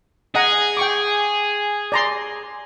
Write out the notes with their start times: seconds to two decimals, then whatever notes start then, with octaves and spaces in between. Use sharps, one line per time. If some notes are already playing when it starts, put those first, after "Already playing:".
0.35 G#4 D#5 F#5 A#5
0.77 G5 C#6 D6
1.92 D5 A#5 C6